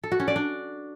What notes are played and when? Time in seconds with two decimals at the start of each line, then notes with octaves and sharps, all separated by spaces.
0.03 A4
0.12 F#4
0.20 C#4
0.28 D5
0.36 D4